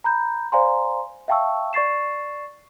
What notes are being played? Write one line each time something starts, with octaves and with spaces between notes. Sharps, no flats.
A#5 B5 G6
C5 D5 F5 G#5 A#5 C6
E5 F5 G5 A5 C#6 E6
D5 C#6 A6 C7 E7